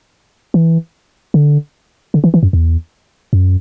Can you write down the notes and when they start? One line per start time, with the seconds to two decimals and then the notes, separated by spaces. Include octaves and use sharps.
0.54 E3
1.34 D3
2.14 D3
2.24 E3
2.34 E3
2.43 F#2
2.53 E2
3.33 F#2